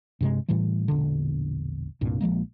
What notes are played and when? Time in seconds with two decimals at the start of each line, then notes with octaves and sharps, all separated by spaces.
0.21 G2 C3 G#3
0.48 A2 E3 G3 A3
0.88 E1 A#1 D3
2.01 C2 G2 A#2
2.21 A#1 F3 G#3 A#3